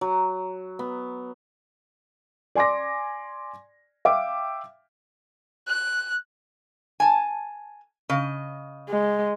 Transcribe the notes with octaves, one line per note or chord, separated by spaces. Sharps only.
F#3
B3
D5 G#5 C6 D6 A#6
E5 F5 G5 D6
F#6
G#5 A5
C#3 D#5
G#3